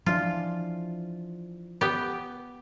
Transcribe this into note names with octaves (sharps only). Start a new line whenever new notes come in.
E3 F3 D4 F4
B3 G4